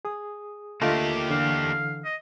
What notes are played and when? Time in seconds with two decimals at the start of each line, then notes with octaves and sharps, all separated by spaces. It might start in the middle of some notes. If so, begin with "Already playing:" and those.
0.05 G#4 D#6
0.81 D3 A3 A#3 F4 G4 D#5
1.30 D3 E3 A4 F5
2.05 D#5